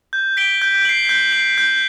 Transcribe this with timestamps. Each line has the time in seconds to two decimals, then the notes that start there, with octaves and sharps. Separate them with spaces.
0.13 G6
0.37 B6 D7 G7
0.62 G6
0.85 C7 F#7
1.09 G6
1.32 C7 F#7
1.58 G6